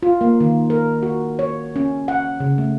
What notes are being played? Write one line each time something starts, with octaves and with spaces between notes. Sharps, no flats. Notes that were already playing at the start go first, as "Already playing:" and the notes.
F4
A#3
D#3
A#4
F#4
C#5
C#4
F#5
C#3
A3